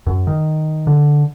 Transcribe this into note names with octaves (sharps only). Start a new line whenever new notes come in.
F#2
D#3
D3